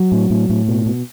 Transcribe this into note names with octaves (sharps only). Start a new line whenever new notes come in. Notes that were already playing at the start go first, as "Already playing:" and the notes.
Already playing: F#3
A2
A2
A2
B2
B2